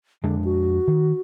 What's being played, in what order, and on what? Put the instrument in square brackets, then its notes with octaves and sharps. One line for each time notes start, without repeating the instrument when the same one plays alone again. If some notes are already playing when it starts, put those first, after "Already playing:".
[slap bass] F2 G#3 D4 [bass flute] D3
[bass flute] F#4
[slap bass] D#3